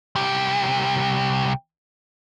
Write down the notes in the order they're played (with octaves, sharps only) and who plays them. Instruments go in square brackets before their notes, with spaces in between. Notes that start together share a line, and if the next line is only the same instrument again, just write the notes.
[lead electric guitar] C2 G4